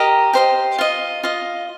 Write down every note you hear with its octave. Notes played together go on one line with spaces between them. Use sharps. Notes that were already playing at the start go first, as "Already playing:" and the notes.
Already playing: G4 A#4 D#5 A#5
G4 C5 D#5
F4 D#5
F4 D#5